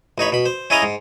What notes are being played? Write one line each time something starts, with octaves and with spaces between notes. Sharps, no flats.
A1 D#4 C#5 B5
B2 B5
C5
C#4 E4 G#4 D#5 F5 A#5
G#2